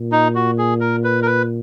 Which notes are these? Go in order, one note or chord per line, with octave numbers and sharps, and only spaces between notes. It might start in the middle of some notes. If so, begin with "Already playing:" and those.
Already playing: A#2
D#4
F#4
G#4
A#4
B4
A#4
B4